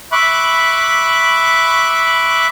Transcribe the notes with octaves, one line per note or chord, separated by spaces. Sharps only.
E5 B5 C#6 D6 F#6